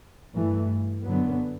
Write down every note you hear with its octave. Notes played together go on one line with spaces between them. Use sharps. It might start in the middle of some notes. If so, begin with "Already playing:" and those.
G2 E3 A3
F#2 D3 F#3 B3